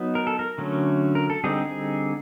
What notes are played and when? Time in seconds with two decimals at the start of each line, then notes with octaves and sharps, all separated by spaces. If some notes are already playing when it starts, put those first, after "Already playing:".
Already playing: F#3 B3 D#4
0.15 A#4
0.27 A4
0.39 A#4
0.58 D3 F#3 A3 C#4
1.15 A#4
1.30 A4
1.44 D3 G3 C4 D#4 G#4
1.66 G#4